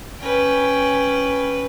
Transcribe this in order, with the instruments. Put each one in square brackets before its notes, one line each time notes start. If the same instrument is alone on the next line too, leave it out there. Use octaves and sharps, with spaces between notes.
[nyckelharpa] C#4 G5 [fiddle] B4